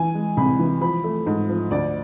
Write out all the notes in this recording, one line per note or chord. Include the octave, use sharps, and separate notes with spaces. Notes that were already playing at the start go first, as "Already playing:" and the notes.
Already playing: E3 G#5
G#3
C2 B5
E3
F3 B5
A3
G#2
F3
D2 D5